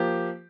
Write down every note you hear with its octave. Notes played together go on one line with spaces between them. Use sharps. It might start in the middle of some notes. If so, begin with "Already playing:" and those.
Already playing: F3 A#3 G4